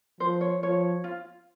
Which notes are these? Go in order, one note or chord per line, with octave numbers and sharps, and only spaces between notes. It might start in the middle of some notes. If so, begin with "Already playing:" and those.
F3 C5
C#5
F3 C#5
F4